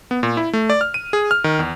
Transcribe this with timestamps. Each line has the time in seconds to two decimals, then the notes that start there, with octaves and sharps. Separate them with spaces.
0.11 B3
0.23 A#2
0.37 E4
0.53 A3
0.70 D5
0.81 F6
0.94 D#7
1.13 G#4
1.31 F6
1.44 D#3
1.59 E2